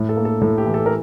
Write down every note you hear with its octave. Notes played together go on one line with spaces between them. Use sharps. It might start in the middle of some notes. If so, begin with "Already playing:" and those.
Already playing: A2
A4
A#3
A4
A2 A4
G4
E3
A4
A#4